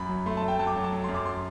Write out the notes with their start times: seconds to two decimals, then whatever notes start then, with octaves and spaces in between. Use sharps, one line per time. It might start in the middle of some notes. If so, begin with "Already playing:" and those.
Already playing: F#2 B5
0.09 F#3
0.26 A3 C6
0.37 A3 A5
0.48 G5
0.59 F#3 A5
0.67 D6
0.76 F#3
0.84 A5
0.93 F#3
1.04 F#2 C6
1.15 D6
1.25 C6